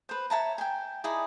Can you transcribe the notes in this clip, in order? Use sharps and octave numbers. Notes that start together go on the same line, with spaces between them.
B4 C5
C#5 E5 A5 A#5
G5 G#5
D#4 E4 G#4 D5